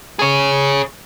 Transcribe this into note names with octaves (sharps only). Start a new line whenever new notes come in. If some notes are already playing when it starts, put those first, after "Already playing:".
G#4 C#5